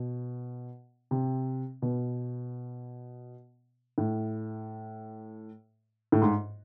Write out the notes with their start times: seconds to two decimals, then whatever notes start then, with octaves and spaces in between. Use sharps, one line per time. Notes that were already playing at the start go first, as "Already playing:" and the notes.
Already playing: B2
1.11 C3
1.82 B2
3.98 A2
6.12 A2
6.22 G#2